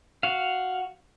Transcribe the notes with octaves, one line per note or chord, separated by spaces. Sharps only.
F#4 F5